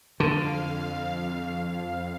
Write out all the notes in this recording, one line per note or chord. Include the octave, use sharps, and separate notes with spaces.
F2 D3 F5